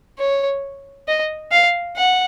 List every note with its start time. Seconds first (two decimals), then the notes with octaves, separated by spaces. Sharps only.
0.19 C#5
1.08 D#5
1.51 F5
1.97 F#5